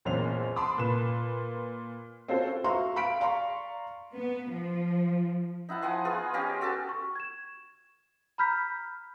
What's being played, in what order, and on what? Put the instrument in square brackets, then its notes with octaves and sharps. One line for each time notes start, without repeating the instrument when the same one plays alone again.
[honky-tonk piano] F#1 E2 A#2 C4 C#4 F7
A5 B5 C6 D6 D#6
A#2 B4 E7
C4 C#4 F4 F#4 A4 C5
[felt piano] F#4 E5 F5 A#5 C6 C#6
F5 B5 B6 D7
D5 F5 A#5 C6 C#6
[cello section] B3
F3
[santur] D#4 E4 F#5 A5
F3 F#5 G#5 C6
B3 F4 G#4
C#4 G4 D#5 F5
F#4 A4 G#5 A5
[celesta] C#6
G#6 E7
A#5 B5 F6 G6 B6